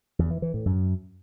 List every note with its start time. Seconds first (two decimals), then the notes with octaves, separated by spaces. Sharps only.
0.19 E2
0.31 E3
0.42 E3
0.54 A2
0.66 F#2